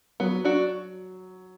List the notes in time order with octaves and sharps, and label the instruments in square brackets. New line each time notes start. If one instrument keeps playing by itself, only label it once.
[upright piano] F#3 [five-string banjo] B3
[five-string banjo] D4 F#4